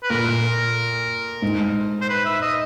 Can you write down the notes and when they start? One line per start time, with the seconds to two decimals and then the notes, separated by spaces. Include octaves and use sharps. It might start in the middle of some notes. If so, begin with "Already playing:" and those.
0.03 B4
0.10 A#2 A#4
1.42 G#2
2.01 C5
2.09 B4
2.25 E5
2.41 D#5